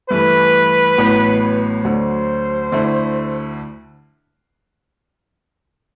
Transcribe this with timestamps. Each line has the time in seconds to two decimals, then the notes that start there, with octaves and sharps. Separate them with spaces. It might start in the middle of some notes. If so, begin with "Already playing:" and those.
0.10 G2 E3 A3 B4
0.98 A1 A2 F#3 B3
1.84 D2 D3 F#3 C5
2.71 D2 D3 A3 E4